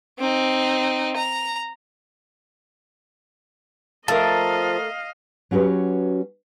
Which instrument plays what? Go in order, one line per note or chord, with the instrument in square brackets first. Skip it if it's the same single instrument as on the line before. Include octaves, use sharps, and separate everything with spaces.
[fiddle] C4 D#4
A#5
[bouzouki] F3 [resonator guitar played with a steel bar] A3 A#4 [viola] D#5 F5 [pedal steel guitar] A5
[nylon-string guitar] F#3 C#4 F#4 G4 B4